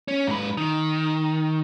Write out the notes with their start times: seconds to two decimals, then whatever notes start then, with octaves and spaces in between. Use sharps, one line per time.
0.08 C#4
0.27 G#2 B4
0.57 D#3